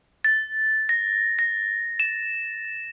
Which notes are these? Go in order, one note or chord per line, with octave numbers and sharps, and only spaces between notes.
A6
A#6
A#6
E7